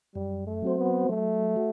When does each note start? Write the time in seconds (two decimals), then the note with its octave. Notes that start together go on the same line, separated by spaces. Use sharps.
0.15 F#2 G3
0.47 A3
0.62 F#3 C4 F#4 C5
0.78 B3
1.09 F#3 A3
1.56 F#4